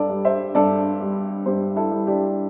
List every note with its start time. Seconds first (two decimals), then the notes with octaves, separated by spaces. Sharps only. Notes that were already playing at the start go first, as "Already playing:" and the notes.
Already playing: G2 A4 D5
0.10 G3
0.25 C5 E5
0.55 G2 A4 D5
1.01 G3
1.46 G2 G4 C5
1.76 E4 A4
1.92 G3
2.07 D4 G4